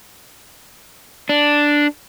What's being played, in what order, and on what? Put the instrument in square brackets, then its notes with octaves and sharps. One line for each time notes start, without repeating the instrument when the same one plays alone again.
[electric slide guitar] D4